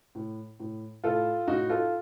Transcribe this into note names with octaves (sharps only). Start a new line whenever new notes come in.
A2
A2
A2 F4 A4
A2 D#4 F#4
F4 A4